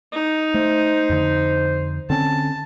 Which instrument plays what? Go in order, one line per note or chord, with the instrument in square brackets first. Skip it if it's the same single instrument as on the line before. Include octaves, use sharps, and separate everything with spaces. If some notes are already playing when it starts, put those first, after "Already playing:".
[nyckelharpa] D#4
[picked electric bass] A3 [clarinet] C5
[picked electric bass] F2 D3
[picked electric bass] D3 C4 C#4 [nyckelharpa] A5